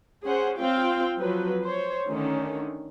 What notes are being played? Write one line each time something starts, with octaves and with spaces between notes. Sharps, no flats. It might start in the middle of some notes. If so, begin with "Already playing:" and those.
C#4 G#4 C5 F#5
C4 F4 F5 G5
F3 F#3 B4
C5 C#5
D3 D#3 A3 C#4